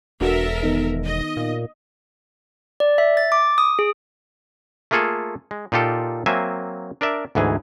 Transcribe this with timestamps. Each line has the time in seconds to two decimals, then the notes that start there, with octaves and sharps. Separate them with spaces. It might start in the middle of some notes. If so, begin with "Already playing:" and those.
0.21 E1 D4 F#4 A4 A#4 E5
0.63 D#3 B3 D#4
1.05 D#5
1.37 A#2
2.80 D5
2.98 E5
3.17 A6
3.32 D6
3.58 D#6
3.79 G#4
4.91 A3 A#3 F4 G#4 A4
5.51 G#3
5.72 A#2 D#4 F4 G4 A4
6.26 F#3 A#3 C4 E5 G#5
7.01 D4 A#4 D5 E5
7.35 D2 G#2 E3 G#4